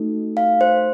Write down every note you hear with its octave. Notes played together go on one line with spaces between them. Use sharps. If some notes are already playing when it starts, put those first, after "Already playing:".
Already playing: A3 D#4 F#4 A4
F5
C5